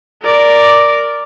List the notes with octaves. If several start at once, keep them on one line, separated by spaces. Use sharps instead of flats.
A#4 D5